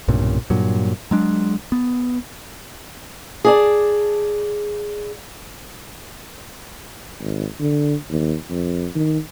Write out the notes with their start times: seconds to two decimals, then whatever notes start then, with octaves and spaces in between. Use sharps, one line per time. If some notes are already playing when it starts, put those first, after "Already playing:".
0.08 B1 G2 A#2 C#3
0.50 G2 A#2 F#3
1.11 F#3 G#3 D4
1.72 B3
3.45 G#4 D5 A5
7.20 G#1
7.60 D3
8.10 D#2
8.50 F2
8.95 D#3